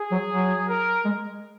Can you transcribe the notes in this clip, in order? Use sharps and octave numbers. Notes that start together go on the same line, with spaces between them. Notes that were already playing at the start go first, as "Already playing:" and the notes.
Already playing: G#4
F#3
F#3
A#4
G#3